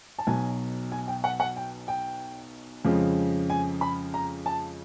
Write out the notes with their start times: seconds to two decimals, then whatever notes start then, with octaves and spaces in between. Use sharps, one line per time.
0.19 A5
0.27 B1 B2 F#3 G#5
0.92 G#5
1.08 G5
1.24 F#5
1.40 F#5
1.56 G5
1.88 G5
2.85 F2 C#3 F3 G#3
3.50 G#5
3.81 B5
4.14 A#5
4.46 A5